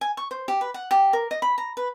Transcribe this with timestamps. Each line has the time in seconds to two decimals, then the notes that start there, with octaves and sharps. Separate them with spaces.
0.01 G#5
0.17 C#6
0.31 C5
0.48 G4
0.61 B4
0.74 F#5
0.91 G4
1.13 A#4
1.31 D#5
1.42 B5
1.58 A#5
1.77 B4